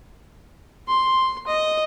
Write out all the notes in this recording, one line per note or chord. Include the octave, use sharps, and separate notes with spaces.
C6
D#5